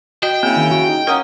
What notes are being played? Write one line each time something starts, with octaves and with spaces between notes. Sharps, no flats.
F#4 D#5 G5
C#3 A#3 C4 E4
D#3
F#4
D#4
A#3 C#4 A#4 F#5 D#6